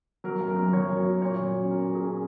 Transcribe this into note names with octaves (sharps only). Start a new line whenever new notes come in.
F#3 A#4
F#2
A#4
F#2
F#3 C#5
F#2 A#4
F#2 A#4
A#2 C#5
F#3
C#4
F#3 A#4
A#2 A#4
G#4
C#4